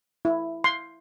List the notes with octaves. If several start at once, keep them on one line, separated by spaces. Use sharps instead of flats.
E4
C6